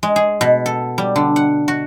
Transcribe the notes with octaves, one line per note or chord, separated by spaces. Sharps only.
G#3
G#4
B2
A4
G3
D3
F#5
F#4